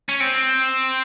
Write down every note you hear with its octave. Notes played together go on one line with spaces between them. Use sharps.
C#4
C4